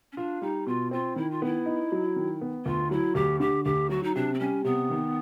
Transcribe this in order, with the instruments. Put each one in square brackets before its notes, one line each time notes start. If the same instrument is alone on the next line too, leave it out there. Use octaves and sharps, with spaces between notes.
[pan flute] C#4
[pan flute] D4 [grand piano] F4
[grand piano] G3 [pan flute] D#4
[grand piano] B2 [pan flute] F4
[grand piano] C4 [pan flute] F4
[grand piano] D#3 [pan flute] E4
[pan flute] F4
[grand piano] B3 [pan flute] E4
[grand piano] D#4
F#3
D#3
B3
[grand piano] D2 [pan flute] F4
[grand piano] F#3 [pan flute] E4
[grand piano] D2 [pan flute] G4
[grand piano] D3 [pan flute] G4
[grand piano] D2 [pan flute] G4
[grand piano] F#3 [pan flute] F#4
[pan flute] D#4
[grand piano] C3 [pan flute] D4
[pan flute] C4
[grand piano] G3 [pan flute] C#4
[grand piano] C3 [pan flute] B3
[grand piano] D#3